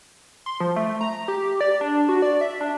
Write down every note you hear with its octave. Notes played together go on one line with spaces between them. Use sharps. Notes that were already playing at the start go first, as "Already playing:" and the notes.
C6
F3
A3
A#5
G4
D5
D4
F#4
D5
E5
D4